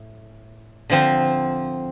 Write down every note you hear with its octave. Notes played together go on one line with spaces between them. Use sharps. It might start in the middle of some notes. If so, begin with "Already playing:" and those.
Already playing: A2
D3 F3 C4